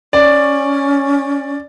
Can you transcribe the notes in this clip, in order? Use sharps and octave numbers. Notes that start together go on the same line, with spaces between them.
C#4 D5